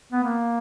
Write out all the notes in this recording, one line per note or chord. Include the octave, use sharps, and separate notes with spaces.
B3
A#3